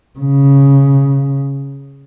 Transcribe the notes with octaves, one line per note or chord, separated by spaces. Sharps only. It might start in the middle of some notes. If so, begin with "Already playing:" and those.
C#3